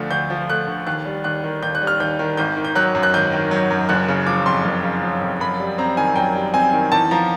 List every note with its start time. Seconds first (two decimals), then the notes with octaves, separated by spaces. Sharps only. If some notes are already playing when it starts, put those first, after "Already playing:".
Already playing: D2 D3 F3 A3
0.11 D2 G6
0.30 F3
0.50 A3 F#6
0.67 D3
0.87 D#2 F#6
1.05 G3
1.24 D#2 F#6
1.44 D#3
1.62 D#2 G6
1.75 F#6
1.82 G3
1.87 F6
2.00 D#2 G6
2.19 D#3
2.37 G#1 G6
2.57 D#3
2.65 G6
2.75 F#3 F#6
2.95 F#2
3.03 F#6
3.14 G#1 G6
3.32 D#3
3.51 F#3
3.70 F#2
3.89 F#1 F#6
4.08 C#3
4.26 F3 D6
4.46 F2 C6
4.65 F#1
4.84 C#3
5.03 F3
5.21 F2
5.40 F#2 B5
5.60 G3
5.78 C4 A#5
5.97 D#3 G#5
6.16 F#2 G5
6.35 G3
6.53 C4 G#5
6.73 D#3
6.92 E2 A5
7.11 F3 A#5